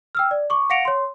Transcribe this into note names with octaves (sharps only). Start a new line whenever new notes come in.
G5 E6 F6
D5
C#6 D6
F5 F#5 A#6 C#7 D7 F7
C#5 C6